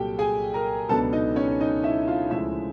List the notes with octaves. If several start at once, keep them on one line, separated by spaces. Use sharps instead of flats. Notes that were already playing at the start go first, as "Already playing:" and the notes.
Already playing: C2 A#2 F#3 G4 A4 G5
G#4 G#5
A#4 A#5
C#2 B2 F#3 B3 D4 A4 A5
D#4 D#5
C#4 C#5
D#4 D#5
E4 E5
F4 F5
D2 C#3 F3 G#3 E4 E5